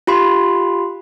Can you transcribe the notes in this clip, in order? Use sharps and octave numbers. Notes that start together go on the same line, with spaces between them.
F4 G4 B5 C6